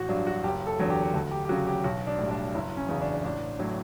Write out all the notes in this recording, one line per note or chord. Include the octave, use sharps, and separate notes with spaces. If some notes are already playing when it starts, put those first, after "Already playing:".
Already playing: A1 F#4
G2 F#3 D4
F#4
F#1 G4
A4
E2 D3 F#3
G4
D2 A4
G4
G4
C#3 F#3 F#4
G4
B1 F#4
D4
A2 G3
D4
F#1 E4
C#4
E2 C#3
D4
A1 D4
A2 F#3